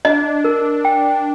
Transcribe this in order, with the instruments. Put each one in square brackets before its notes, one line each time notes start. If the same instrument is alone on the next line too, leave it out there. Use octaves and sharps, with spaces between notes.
[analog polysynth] D4 [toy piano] D#5
[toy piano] A#4
G5